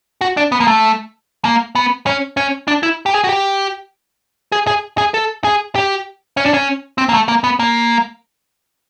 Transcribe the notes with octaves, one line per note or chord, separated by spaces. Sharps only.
F#4
D4
B3
A#3
A3
A#3
B3
C#4
C#4
D4
E4
G4
G#4
F#4
G4
G#4
G#4
G#4
A4
G#4
G4
C#4
D4
C#4
C4
A#3
A3
A#3
B3
A#3